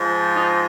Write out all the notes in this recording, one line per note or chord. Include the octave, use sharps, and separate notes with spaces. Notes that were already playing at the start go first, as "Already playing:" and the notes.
Already playing: G#2 F3
D#4